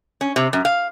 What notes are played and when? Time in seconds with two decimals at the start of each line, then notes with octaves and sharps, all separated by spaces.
0.21 C#4
0.36 C3
0.53 F#2
0.65 F5